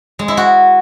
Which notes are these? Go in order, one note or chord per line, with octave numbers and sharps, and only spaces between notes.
G#3
E4
F#4